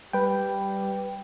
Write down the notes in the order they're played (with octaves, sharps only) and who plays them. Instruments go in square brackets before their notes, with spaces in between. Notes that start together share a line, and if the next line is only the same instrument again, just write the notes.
[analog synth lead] G3 [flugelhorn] G4 [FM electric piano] B4 G5